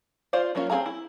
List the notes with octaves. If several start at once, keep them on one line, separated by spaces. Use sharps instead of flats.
F4 C5 D5 F5
F#3 A#3 C#4 E4 F4
C4 E4 G#4 F5 A#5
E4